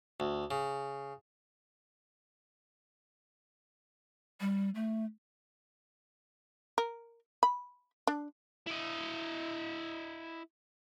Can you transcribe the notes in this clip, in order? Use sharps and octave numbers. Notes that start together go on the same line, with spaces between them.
D2
C#3
G3
A3
A#4
B5
D4
E4 D#5